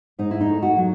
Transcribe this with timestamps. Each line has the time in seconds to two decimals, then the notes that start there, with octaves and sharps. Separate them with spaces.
0.19 G#2 D#4
0.31 E4
0.41 D#4
0.48 A3
0.62 F#4
0.77 F#3